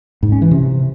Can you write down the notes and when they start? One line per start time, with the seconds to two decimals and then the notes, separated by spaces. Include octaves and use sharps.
0.23 G#2
0.32 C#4
0.42 E3
0.51 C3